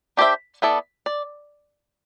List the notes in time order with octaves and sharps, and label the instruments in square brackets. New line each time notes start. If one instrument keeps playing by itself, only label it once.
[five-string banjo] D4 G4 C5 E5
B3 E4 A4 D5
D5